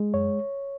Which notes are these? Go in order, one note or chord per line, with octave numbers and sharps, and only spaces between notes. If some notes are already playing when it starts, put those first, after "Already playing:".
Already playing: G#3
F#2 C#5